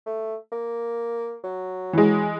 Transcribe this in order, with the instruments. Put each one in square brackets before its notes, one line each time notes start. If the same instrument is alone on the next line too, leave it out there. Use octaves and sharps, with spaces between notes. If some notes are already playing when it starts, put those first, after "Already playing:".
[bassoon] A3
A#3
F#3
[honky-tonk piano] E3 G#3